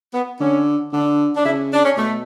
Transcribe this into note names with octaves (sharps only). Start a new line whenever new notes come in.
B3
D3 C#4
D3 D4
D4
C#3 E4
D4
C#4
B2 A3